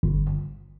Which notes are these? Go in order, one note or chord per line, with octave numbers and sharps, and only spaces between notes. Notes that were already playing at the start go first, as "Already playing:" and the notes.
G1